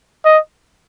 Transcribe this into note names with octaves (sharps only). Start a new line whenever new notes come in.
D#5